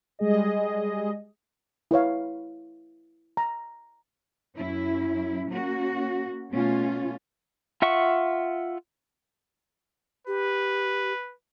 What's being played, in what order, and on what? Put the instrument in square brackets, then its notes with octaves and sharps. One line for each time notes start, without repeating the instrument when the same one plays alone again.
[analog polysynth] G3 G#3 G#4 D#5
[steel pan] E4 B4 C#5 F5
A#5
[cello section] F#2 C#4 E4
A#3 C#4 F#4
B2 A3 C#4 F4
[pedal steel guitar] F4 E5 F#5 C#6
[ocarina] G4 [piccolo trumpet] B4